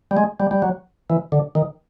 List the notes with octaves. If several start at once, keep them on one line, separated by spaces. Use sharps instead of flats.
G3
G#3
G3
G3
F#3
E3
D3
D#3